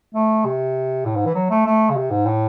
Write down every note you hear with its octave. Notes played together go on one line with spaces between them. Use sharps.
A3
C3
A2
G#2
E3
F#3
A3
A3
C#3
C3
G#2
A2